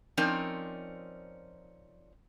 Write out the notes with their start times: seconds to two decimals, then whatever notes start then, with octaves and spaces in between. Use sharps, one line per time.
0.17 F3 C4 C#4 D#4 A#4 D5